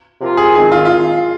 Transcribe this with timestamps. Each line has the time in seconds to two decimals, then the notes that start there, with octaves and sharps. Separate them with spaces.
0.20 C3 F3 A#3 F4
0.37 G#4
0.55 G#2 D#3 C4 G#4
0.72 F4
0.85 F4